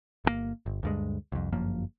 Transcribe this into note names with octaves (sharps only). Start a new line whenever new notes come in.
G1 C3 A#3
G1
D2 G2 G#3
C2 F2
G1 F#2 F3 A#3